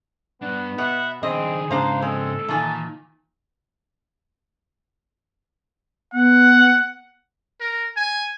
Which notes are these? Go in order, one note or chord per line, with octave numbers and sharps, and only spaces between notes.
G2 B3 D4 F#5
B2 E5 F#5
D#3 C4 D4 G#4 D#5
G#2 C#3 D4 C5 F5 A#5
G#3 C4 A4
A#2 D#3 E3 G#5 A5
B3 F#5
A#4
G#5